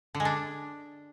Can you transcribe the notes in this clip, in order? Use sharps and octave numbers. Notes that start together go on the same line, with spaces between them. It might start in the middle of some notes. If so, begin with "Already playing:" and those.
D3
G#3
D4